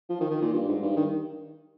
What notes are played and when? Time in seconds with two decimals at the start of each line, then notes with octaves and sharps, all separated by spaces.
0.09 F3
0.20 D#3
0.31 D#3
0.42 A#2
0.53 G2
0.68 G#2
0.82 G2
0.97 D#3